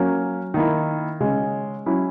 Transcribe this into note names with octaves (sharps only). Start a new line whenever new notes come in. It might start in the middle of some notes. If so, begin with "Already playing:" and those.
Already playing: F#3 A#3 C#4
D#3 A#3 E4
C#3 G#3 C#4
F#3 C#4 E4